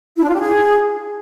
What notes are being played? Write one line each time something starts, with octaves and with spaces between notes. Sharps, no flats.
E4
D4
F4
G4
G#4